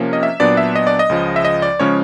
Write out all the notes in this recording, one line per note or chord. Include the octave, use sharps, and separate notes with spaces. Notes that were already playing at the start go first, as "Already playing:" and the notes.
Already playing: C3 F3 A#3 C#4
D#5
E5
A#2 F#3 B3 D4 D5
E5
D#5
D5
D#5
C#2 C#3 F3
E5
D#5
D5
C#3 F3 G#3 C#4 C#5